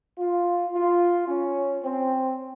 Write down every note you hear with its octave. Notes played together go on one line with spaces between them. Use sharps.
F4
F4
C#4
C4